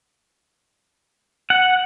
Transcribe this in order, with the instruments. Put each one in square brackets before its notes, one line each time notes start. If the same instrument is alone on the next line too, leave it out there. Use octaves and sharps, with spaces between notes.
[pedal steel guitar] F#5